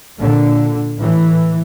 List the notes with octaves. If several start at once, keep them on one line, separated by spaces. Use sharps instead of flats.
A#2 D3
A2 E3